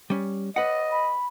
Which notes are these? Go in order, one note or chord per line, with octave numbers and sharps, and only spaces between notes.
G3 C#4
B4 D#5 F#5
B5